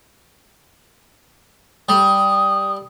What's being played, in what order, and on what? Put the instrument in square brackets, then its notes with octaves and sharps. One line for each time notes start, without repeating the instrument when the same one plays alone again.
[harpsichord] G3 [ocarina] D#6